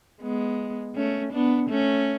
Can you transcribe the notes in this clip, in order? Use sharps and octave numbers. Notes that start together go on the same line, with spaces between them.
G#3 B3
A3 C#4
B3 D4
A3 C#4